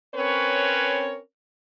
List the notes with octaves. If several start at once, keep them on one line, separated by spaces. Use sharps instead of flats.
C4 C#4 A#4 B4 C#5